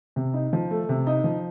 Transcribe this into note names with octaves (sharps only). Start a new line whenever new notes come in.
C3
D#4
F3
A3
C3
D#4
F3